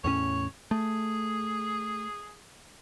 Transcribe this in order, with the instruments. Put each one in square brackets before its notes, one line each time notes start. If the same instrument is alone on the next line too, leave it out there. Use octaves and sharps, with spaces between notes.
[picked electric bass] E2 A2 C#4 [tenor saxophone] C#5
[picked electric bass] A3 [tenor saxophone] G#4